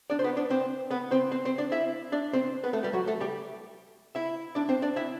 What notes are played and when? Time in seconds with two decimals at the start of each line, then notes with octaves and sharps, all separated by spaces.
0.10 D4 D5
0.19 C5
0.24 B3 B4
0.37 D4 D5
0.50 C4 C5
0.91 B3 B4
1.11 C4 C5
1.31 C4 C5
1.45 C4 C5
1.58 D4 D5
1.72 E4 E5
2.12 D4 D5
2.33 C4 C5
2.64 B3 B4
2.73 A3 A4
2.83 G3 G4
2.93 F#3 F#4
3.07 A3 A4
3.20 G3 G4
4.15 E4 E5
4.55 D4 D5
4.69 C4 C5
4.82 D4 D5
4.96 E4 E5